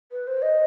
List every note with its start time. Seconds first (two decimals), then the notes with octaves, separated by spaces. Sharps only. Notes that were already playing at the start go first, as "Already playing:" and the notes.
0.12 B4
0.27 C5
0.42 D#5